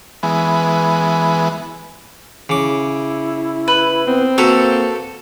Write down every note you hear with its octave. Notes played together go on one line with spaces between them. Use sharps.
E3 G#3 B3
C#3 E4 D6
B4
B3 C4
A#3 F#4 A4 B4 A#5